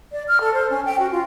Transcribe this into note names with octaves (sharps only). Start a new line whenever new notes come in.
D5
F6
A4
C5
C#4
G5
F#4
F4